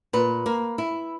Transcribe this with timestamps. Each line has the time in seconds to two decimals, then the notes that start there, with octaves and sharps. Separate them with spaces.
0.13 A#2 B4
0.46 A#3
0.78 E4